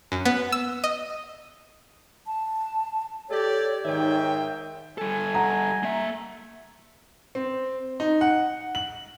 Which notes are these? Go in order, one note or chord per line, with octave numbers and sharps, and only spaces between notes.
F#2
B3
E6
D#5
A5
G4 A4 C#5 D5
G#2 D#3 E5 G5
G3 A4 G#5
F#5 A#5
A#3 E5
C4
D#4
F#5
F#7